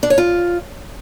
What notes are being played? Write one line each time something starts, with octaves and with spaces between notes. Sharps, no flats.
D4
C#5
F4